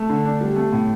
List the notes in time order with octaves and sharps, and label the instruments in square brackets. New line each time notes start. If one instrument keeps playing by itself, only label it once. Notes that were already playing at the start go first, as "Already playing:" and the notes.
Already playing: [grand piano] A3
D3
D4
G3
A3
A2